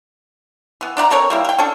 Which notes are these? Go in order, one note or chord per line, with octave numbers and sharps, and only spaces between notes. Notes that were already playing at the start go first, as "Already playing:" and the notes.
E3 B3
D4 D5 F#5 A#5
C4 A4 A#4 C#5
G3 A#3 E4
A#4 G5
C#4 D4 A4